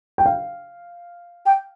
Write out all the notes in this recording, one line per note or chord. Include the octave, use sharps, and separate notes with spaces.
G5
F5
G5